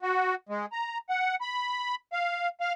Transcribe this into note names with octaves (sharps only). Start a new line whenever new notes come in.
F#4
G#3
A#5
F#5
B5
F5
F5